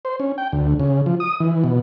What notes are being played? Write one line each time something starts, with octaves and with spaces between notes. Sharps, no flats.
C5
C#4
G5
D2
C#3
F3
D#6
E3
B2